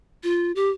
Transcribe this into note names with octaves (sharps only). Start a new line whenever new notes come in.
F4
G4